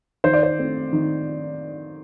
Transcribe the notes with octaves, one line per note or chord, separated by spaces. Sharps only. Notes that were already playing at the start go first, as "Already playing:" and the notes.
D#3 C5
D5
C5
A3 C4
D#3